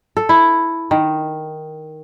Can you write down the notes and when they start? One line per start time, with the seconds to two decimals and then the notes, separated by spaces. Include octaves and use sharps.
0.17 A4
0.29 E4
0.91 D#3